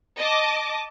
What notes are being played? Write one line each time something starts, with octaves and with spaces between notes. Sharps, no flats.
D#5 A5 D6